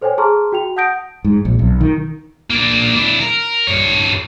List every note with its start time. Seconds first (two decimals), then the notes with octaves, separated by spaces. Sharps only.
0.01 A4 C5 C#5 G5 G#5
0.18 G#4 A5 A#5 C6 C#6 F6
0.52 F#4 G5 F7
0.77 F#5 A5 D#6 G6 A#6 D7
1.25 G#2
1.45 A#1
1.59 B1
1.81 D#3
2.51 A#3 D4
2.95 D4 E4
3.21 A#4
3.67 G2 C#5